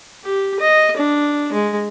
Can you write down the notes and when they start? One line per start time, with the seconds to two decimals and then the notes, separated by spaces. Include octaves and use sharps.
0.24 G4
0.60 D#5
0.98 D4
1.53 G#3